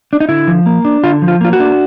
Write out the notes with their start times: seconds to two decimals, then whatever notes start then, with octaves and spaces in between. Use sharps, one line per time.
0.13 D4
0.20 D#4
0.29 D3 E4
0.48 F3
0.66 A#3
0.85 D4
1.04 D3 F4
1.22 F3
1.28 F4
1.41 A#3 F4
1.53 F#4
1.60 D4